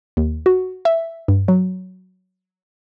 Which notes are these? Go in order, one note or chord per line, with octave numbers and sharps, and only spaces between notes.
D#2
F#4
E5
G2
F#3